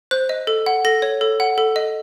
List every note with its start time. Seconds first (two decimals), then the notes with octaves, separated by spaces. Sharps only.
0.11 C5 F#6
0.29 D#5
0.47 A4
0.66 F#5
0.85 A4 A#6
1.02 C#5
1.21 A4
1.40 F#5
1.58 A4
1.76 D#5